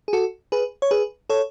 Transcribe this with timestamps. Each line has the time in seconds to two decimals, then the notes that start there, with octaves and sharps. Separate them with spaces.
0.08 G#4
0.13 F#4 A4
0.52 G#4 B4
0.82 C#5
0.91 G#4 B4
1.30 A4 C#5